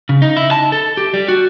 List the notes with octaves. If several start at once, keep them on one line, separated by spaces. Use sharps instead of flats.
C#3
D#4
E4
A5
A4
G4
G3
F#4